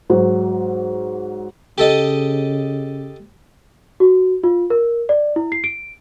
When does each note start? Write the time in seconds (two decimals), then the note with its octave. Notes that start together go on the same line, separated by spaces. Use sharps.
0.10 G#2 F#3
1.78 C#3 G4 A4 D#5
4.00 F#4
4.44 F4
4.70 A#4
5.09 D5
5.36 E4
5.52 C7
5.64 D7